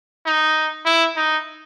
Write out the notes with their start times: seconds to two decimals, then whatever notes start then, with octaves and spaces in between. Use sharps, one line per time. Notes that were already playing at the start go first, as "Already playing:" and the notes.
0.26 D#4
0.85 E4
1.16 D#4